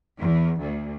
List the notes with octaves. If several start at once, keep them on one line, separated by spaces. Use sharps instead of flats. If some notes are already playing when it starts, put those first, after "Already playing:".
E2
D2